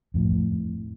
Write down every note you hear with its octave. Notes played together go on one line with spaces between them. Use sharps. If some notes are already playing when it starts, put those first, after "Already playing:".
F2 A2